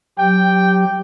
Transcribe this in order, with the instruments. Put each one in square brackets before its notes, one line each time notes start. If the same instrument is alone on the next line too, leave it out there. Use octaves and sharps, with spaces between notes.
[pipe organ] F#3 G4 [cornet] G5